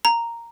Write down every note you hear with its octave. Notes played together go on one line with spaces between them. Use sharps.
A#5